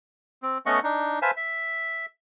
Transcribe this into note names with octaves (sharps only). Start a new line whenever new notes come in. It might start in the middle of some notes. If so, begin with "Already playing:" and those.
C4
A3 B3 C#4 D#5 F#5 C#6
D4 D#4
B4 C5 E5 F5 G#5 A5
E5